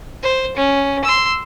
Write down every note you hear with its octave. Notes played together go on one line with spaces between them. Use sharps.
C5
C#4
C6 E6